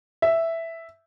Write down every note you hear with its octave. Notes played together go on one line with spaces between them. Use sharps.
E5